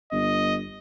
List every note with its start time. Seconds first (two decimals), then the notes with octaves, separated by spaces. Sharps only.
0.12 G1 D#5